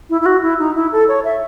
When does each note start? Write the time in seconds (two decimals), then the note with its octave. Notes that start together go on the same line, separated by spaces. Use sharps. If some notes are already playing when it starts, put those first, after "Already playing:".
0.10 E4
0.21 E4
0.26 F#4
0.42 E4
0.59 D#4
0.75 E4
0.92 A4
1.08 C#5
1.24 E5